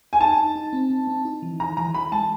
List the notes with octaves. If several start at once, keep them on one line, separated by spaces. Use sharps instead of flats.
G#5
D#4 A5
D#4
D#4
C4
C4
C4
D#4
E3
E3 A#5
E3 A#5
E3 B5
G#3 A5